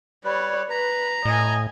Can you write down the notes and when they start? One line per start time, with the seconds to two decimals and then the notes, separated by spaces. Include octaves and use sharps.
0.24 G3 B4 C#5 D5
0.70 B4 A#5
1.25 A2 D#5 G#5